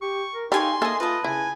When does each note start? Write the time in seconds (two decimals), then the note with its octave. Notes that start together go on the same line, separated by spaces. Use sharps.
0.02 G4 C#6
0.34 A#4
0.52 D#4 G4 A4 F5 G#5 C6 C#6
0.82 A#3 G#4 A4 D#5 E5
1.00 F4 B4 D#5 A5
1.24 C#3 E4 G#5